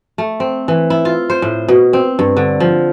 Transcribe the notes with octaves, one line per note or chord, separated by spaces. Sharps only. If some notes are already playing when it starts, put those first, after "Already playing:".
A3
C4
E3
E4
F4
C5
A2
B2
C4
G2
D3
F3